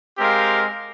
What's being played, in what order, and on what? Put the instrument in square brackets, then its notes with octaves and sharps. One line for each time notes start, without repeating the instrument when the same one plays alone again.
[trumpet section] G#3 C4 G4 A#4 F5